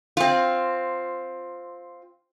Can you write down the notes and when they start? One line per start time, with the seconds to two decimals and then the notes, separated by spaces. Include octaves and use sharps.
0.17 C4 F4